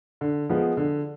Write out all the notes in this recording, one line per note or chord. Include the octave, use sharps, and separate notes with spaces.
D3
F3 G#3 B3
D3